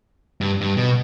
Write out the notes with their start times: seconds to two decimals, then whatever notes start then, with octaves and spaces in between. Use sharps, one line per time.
0.41 G2
0.61 G2
0.77 B2